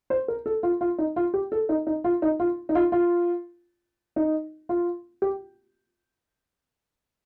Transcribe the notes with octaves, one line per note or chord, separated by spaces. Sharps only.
C5
A#4
A4
F4
F4
D#4
F4
G4
A4
D#4
D#4
F4
D#4
F4
D#4
F4
F4
D#4
F4
G4